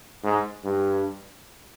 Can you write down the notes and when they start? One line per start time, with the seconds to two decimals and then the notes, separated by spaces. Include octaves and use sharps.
0.23 G#2
0.64 G2